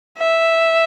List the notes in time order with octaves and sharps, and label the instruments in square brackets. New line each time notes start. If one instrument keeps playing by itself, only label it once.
[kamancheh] E5